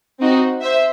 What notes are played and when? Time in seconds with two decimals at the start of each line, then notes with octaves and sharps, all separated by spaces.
0.20 C4 D#4 F#4
0.61 C5 E5